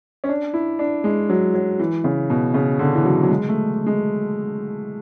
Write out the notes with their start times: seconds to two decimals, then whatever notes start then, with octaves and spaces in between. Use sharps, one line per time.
0.24 C#4
0.29 D4
0.54 E4
0.79 D4
1.04 G#3
1.29 F#3
1.54 F#3
1.79 E3
2.04 C#3
2.30 B2
2.54 C#3
2.79 D3
2.95 E3
3.05 F#3
3.23 F#3
3.30 G#3
3.48 A3
3.86 G#3